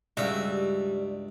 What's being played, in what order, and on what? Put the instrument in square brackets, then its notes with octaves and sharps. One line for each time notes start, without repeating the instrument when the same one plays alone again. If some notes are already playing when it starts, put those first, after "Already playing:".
[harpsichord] C#2 E5 [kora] G2 F#4 [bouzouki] G3